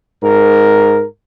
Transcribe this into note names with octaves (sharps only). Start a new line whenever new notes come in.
G#2 A#4